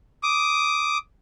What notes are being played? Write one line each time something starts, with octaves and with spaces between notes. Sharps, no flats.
D6 D#6